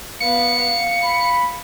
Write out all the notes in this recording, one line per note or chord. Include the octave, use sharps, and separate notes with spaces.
B3 B4 F5 C#7
F5
B5